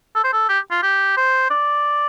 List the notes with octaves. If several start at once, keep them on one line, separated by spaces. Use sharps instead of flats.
A4
C5
A4
G4
F4
G4
C5
D5